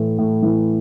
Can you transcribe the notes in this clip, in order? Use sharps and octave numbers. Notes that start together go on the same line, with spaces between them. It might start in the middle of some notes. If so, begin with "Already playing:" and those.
Already playing: A2 E3
A2
E3